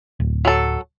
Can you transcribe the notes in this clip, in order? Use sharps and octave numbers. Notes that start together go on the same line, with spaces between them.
D1
F#3 A4